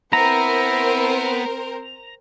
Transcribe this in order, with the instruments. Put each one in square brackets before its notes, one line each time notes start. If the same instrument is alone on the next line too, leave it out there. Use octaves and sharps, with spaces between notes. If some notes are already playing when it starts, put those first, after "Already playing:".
[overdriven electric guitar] B3 [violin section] C4 A#4 C5 [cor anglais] E4 [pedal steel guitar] A#5